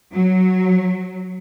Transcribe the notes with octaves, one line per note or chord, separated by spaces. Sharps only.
F#3